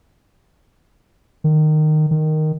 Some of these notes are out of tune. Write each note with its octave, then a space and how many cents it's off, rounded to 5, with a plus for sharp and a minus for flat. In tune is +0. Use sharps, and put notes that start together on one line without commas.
D#3 -15
D#3 -5